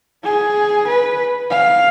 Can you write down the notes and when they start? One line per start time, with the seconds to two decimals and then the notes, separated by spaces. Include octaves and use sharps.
0.24 G#4
0.87 B4
1.50 F5